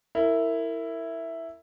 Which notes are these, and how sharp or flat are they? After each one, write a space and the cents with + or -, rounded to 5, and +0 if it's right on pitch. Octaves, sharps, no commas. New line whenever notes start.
E4 +0 A#4 -30